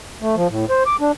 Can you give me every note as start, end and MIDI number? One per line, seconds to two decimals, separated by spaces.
0.22 0.35 57
0.36 0.48 53
0.50 0.65 45
0.70 0.83 72
0.86 0.96 86
1.01 1.12 62